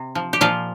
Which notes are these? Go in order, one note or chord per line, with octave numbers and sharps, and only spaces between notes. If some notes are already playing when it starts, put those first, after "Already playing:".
Already playing: C3
F3
G4
A#2 F3 F4